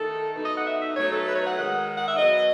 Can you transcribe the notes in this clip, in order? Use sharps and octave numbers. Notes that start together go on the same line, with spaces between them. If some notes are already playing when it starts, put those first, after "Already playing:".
Already playing: D#3 A3 D#4 A4
B2 A3 D#4
D#5
F#5
E5
E5
B2 F#3 A3 D#4 C#5
A4
B4
C#5
F#5
D#3 G#3 D#4
F#5
E5
B2 F#3 B3 D#5